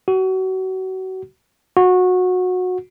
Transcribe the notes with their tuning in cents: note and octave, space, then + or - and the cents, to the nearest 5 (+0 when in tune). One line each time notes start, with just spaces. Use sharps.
F#4 +30
F#4 -20